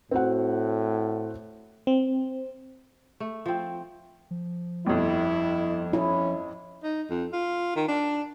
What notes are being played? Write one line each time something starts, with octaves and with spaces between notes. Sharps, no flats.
A2 C4 F#4 F#5
C4
A3
F3 C4
F3
G1 F2 E4
C#4 E4
D#4
F2
F4
D#3
D4